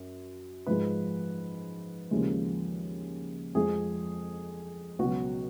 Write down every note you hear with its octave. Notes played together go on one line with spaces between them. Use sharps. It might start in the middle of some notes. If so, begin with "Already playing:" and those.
Already playing: F#2
G#2 F3 G#3 B4
D#2 C#3 F3 G#3
F2 F3 G#3 G#4
C#2 B2 F#3 F#4